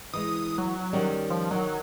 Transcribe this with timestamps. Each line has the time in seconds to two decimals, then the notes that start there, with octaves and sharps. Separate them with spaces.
0.13 E3 G#3 D#6
0.58 F#3
0.93 D#3 G3 C#4
1.30 F3
1.51 D#3 F#3